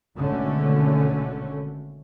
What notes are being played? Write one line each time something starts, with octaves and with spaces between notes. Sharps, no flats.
G#1 B2 D3 A3 C#4